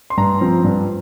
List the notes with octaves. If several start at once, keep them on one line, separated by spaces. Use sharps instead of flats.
C6
G2 A#5
F3 C4
G2